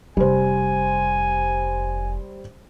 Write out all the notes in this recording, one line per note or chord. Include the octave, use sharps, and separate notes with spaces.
F1 G3 C5 G#5